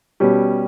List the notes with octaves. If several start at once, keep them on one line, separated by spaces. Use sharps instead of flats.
B2 G3 C#4 G4